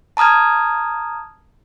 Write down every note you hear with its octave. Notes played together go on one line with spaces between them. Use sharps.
A5 A#5 D#6 F6 G#6